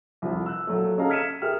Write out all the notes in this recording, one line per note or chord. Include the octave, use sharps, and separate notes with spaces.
C2 F2
E6 F#6
A#2 F#3 A3
C#4 G#4 A4 D#5 F5 A#5
F6 G#6 B6 C#7 D#7 E7
G#4 A#4 E5 G5 F6